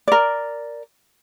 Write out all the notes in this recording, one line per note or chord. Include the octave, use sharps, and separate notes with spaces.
A#4 D5